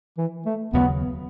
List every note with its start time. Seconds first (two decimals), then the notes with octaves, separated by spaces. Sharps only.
0.18 E3
0.46 A3
0.73 D#2 C#3 F#3 B3